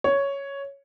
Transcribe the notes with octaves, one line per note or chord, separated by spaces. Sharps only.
C#5